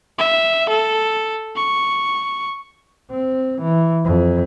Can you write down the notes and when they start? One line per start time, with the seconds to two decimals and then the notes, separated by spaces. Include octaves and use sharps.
0.19 E5
0.69 A4
1.56 C#6
3.11 C4
3.62 E3
4.05 F2